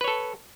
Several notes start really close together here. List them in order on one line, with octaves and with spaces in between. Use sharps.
B4 C#5 A4